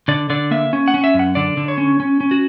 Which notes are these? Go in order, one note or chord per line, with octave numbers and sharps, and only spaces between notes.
D3 D5
D3 D5
A#3 E5
C#4
F#5
C#4
E5
F#2
F#5
D3 D5
D3
C#5
C#4
C#4
C#4
F#4